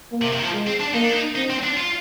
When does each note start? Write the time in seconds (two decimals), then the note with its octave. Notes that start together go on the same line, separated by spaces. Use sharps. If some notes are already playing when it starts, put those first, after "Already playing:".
0.12 A#3
0.21 C3
0.32 C3
0.39 D#3
0.43 F3
0.53 G#3
0.67 C4
0.80 D4
0.94 A#3 D#4
1.04 D4
1.12 D#4
1.36 C4 D#4
1.50 C4
1.64 D4
1.77 F4